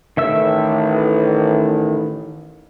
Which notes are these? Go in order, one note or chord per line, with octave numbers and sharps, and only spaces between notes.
A1 D#3 E5 E6